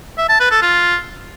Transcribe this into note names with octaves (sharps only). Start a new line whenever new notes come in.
E5
A5
B4
A4
F4